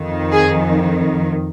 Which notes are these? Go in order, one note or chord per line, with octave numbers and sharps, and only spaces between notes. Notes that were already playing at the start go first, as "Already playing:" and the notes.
Already playing: F2 D#3
G#4